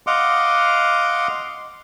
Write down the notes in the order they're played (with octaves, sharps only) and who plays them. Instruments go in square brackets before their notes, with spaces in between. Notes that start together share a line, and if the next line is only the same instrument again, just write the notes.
[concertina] D#5 F5 F#5 C6 D6